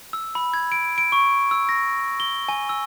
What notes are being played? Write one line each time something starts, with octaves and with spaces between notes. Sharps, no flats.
E6
B5
G#6
D7
D7
C#6
E6
A#6
G7
G#5
E6